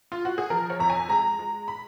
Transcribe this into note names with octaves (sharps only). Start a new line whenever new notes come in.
F4
F#4
G#4
F3 A#4
C#5
F2 A#5
G#5
G#3 A#5
G#3
B5